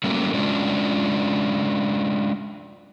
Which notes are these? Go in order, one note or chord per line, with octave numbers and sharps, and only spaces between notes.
F#3 G3 A3 A#3 C#4
G#3 C#4 D4 F4